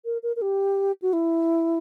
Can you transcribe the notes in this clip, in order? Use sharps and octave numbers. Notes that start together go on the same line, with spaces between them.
A#4
A#4
A#4
G4
F#4
E4